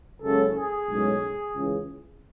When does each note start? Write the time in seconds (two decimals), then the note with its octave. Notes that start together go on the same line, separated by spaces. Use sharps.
0.22 F#1 F#2 C#3 G#3 C#4 A4
0.54 G#4
0.88 B1 A2 G#3 C#4
1.54 C#2 C#3 E3